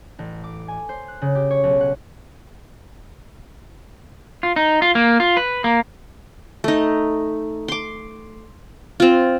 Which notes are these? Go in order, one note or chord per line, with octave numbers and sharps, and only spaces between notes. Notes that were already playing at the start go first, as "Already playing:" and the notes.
A1
D6
G#5
C5
F#6
C#3
G4
C#5
B1
F#5
F4
D#4
F4
A#3
F4
B4
A#3
A3 D#4
C6 D6
C4 F4